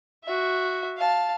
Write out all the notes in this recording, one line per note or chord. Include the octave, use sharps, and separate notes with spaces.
F#4 E5
F5 A5